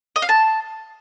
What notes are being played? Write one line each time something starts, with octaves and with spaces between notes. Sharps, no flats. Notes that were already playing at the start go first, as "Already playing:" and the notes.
D#5
F5
A5